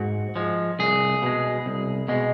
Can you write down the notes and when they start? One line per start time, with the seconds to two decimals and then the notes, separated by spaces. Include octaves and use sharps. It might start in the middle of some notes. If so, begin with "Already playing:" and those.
Already playing: G#2 F#4
0.36 F3 G#3
0.79 C2 G#4
1.22 B2 G#3
1.66 C2
2.08 B2 G#3